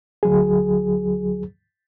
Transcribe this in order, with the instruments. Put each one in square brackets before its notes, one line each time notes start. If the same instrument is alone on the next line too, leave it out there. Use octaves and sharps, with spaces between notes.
[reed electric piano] D2 F#3 G#4